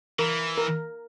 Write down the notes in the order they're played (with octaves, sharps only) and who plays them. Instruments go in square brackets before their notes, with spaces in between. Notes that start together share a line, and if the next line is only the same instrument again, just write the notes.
[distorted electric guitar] E3 [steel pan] A#4
[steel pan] A#4